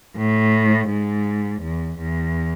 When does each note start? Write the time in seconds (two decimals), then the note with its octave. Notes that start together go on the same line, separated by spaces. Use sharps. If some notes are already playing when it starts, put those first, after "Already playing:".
0.17 A2
0.89 G#2
1.62 E2
1.99 E2